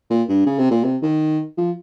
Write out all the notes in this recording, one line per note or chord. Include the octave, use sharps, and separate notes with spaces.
A#2
G2
C#3
C3
A#2
C3
D#3
F3